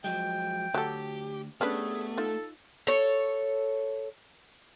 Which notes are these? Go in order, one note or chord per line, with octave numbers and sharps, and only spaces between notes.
F3 F#3 G#3 G5
D2 F#3 G4 A4
A3 B3 C#4 D4 G4 G#4 B4
D#4 F4 A4
A4 C#5